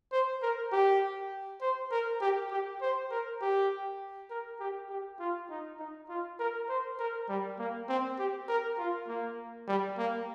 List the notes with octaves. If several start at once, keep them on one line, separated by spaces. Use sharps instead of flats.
C5
A#4
G4
C5
A#4
G4
G4
C5
A#4
G4
A#4
G4
G4
F4
D#4
D#4
F4
A#4
C5
A#4
G3
A#3
C4
G4
A#4
F4
A#3
G3
A#3